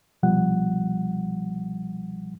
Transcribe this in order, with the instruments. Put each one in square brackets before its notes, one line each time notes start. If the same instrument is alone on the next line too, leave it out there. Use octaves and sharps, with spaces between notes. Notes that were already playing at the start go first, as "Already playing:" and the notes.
[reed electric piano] C2 B2 F3 G3 F#5